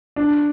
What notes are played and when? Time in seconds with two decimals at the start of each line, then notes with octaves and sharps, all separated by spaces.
0.16 D4